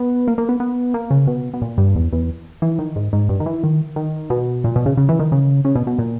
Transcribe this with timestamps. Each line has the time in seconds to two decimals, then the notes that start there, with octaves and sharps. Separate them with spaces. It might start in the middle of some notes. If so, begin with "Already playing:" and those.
Already playing: B3
0.28 A#3
0.38 A#3
0.49 B3
0.60 B3
0.94 A#3
1.11 C#3
1.27 B2
1.54 B2
1.62 A#2
1.78 G2
1.95 E2
2.12 E2
2.62 E3
2.79 D#3
2.96 G#2
3.13 G#2
3.29 G2
3.40 D#3
3.46 E3
3.64 D#3
3.96 D#3
4.30 B2
4.64 A#2
4.76 B2
4.86 C#3
4.97 C#3
5.09 E3
5.19 D#3
5.32 C#3
5.65 C#3
5.75 B2
5.87 B2
5.98 A#2